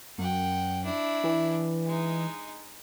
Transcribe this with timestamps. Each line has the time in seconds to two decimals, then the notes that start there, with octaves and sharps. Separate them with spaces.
0.18 F#2 F#5 G5
0.84 D4 E4
1.24 E3
1.86 G#3 D#4